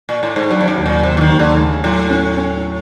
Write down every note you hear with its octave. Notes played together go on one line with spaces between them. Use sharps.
A#2
A2
G#2
G2 F#3
F2
F#2
D#2
A#2
D#2 C3
E3
D#3
D#2
D3
C#3 A3
A2 F#3
C#4
C#4